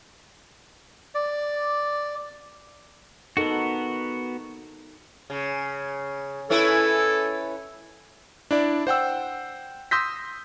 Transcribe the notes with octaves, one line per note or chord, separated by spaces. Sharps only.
D5
B3 D#4 F#4 A4 A#4
C#3
C#4 E4 A4 B4
D4 E4 D5
C5 F#5 G5 E6
C6 D#6 E6 G6 A#6 B6